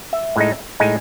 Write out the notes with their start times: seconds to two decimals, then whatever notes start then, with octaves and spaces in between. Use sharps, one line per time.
0.13 E5
0.36 A2 G#3 D#4
0.80 A2 G#3 D#4 G#5